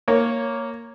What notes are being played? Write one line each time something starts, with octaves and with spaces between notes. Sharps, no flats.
A#3 C#5